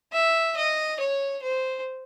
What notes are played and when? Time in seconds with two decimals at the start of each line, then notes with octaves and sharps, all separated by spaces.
0.13 E5
0.57 D#5
1.00 C#5
1.42 C5